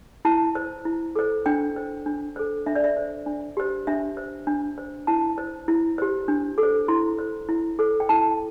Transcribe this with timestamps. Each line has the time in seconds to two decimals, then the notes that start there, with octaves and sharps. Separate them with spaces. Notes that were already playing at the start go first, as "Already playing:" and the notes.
0.25 E4 A5
0.55 C5
0.85 E4
1.16 A4 C5
1.46 D4 G5
1.76 C5
2.06 D4
2.36 A4 C5
2.66 D4 E5
2.75 D5
2.84 E5
2.97 C5
3.26 D4
3.57 G4 C5
3.87 D4 E5
4.17 C5
4.47 D4
4.78 C5
5.07 E4 A5
5.38 C5
5.68 E4
5.98 G4 C5
6.28 D4
6.58 A4
6.63 C5
6.88 E4 C6
7.19 C5
7.49 E4
7.79 A4 C5
8.00 G5
8.09 E4 A5